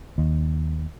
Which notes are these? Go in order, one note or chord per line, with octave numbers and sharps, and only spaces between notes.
D#2